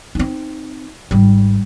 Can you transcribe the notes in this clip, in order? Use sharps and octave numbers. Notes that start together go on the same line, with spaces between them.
C4 D#4
G#1 G3